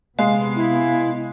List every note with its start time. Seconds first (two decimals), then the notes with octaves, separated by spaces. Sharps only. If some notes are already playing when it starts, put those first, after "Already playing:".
0.19 C3 G#3 B3 F5
0.56 E4